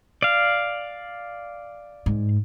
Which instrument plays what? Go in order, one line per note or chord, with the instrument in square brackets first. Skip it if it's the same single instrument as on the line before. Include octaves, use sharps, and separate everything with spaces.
[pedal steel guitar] D5 F5
[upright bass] G#2